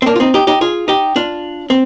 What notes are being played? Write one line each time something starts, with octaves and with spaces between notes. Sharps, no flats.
C4
A#3 D4
F4
C4 D#4
D#4 G4
D#4 G4
F4 G#4
D#4 G4
D4 F4
C4